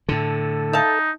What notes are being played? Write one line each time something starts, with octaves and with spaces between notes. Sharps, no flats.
A2 D3 A4
D#4 E5 F5 A5